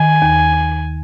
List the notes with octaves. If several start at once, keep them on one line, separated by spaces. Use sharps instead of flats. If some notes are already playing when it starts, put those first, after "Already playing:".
Already playing: D#3 G#5
D#2